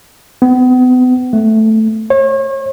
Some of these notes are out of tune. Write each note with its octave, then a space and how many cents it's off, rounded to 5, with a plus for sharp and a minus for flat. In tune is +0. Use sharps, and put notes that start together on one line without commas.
B3 +35
A3 +0
C#5 -35